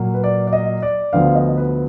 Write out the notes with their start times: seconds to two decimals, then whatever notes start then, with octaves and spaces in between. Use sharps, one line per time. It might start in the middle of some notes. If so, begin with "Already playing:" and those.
Already playing: A#2 F#3 A#3
0.14 B4
0.24 D5
0.47 D5
0.53 D#5
0.82 D5
1.13 D2 D3 F3 B3 F5
1.35 D#5
1.57 B4